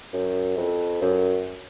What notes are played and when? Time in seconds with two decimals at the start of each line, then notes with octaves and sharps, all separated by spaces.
0.13 F#2
0.57 F2
1.02 F#2